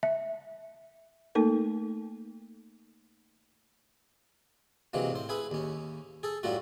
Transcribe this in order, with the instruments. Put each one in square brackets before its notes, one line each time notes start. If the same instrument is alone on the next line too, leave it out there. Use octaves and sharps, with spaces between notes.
[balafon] E5
[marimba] A3 A#3 D#4 A4 A#4
[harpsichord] C3 E3 F#3 G#3 A#3
A2 C5
E4 G#4 B4
D#2 C#4
G#4 A4
F#2 A2 G3 A3 F4 F#4